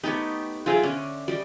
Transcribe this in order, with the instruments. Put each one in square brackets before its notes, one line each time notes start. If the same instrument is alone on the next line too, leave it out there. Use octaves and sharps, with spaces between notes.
[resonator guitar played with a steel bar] A3 B3 G4 [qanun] D#4 C#5
[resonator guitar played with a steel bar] F#3 F4 G#4 [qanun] C5 E5 G5
[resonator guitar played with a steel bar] D3 [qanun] C#4
[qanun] G3 G4 D#5